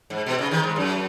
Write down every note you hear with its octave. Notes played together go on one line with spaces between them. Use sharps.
G#2
B2
C#3
D#3
G#2
F#2